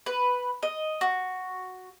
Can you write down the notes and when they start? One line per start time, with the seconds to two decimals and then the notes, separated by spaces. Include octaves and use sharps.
0.06 B4
0.63 D#5
1.01 F#4